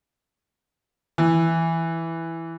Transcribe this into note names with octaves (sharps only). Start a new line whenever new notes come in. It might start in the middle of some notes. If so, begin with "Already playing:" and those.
E3